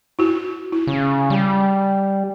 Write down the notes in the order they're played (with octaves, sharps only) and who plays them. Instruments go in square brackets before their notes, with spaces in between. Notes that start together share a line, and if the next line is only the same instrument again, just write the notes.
[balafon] E4 F#4
E4
[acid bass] C#3
G3